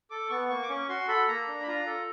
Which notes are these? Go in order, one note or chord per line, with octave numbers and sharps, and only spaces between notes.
A4 D6
B3 C#6
A#3 C#6
D6
C#4 C#6
F#4 C6
A4 B5
A#3 A#5
D4
B5
F4 A#5
A4